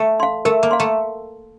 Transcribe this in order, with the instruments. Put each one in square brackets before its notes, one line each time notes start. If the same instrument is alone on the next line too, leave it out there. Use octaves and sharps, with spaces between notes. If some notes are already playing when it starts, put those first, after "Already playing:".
Already playing: [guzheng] A3
[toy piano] F5 C6
[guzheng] A3 [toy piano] A#4
[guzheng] A#3
[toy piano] F5 C6
[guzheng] A3